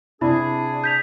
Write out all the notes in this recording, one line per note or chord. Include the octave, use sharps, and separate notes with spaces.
C3 D4 E4 G#4 B5
G6 B6 F7